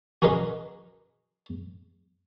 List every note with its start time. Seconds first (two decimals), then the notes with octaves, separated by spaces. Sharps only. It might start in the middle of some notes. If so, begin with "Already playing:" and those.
0.22 F#4 G#4 A#4 B4 D#5 C6